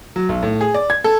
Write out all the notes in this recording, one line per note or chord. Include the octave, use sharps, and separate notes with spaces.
F#3
B1
A2
G#4
D5
G#6
A4